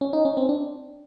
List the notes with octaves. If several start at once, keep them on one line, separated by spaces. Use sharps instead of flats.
C#4
D#4
C#4
C4
D4